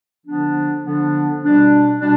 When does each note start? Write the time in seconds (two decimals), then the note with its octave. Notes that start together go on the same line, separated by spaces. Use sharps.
0.25 D3 F3 B3 D4
0.82 D3 F3 B3 D4
1.41 B2 G3 D4
1.99 B2 G3 D4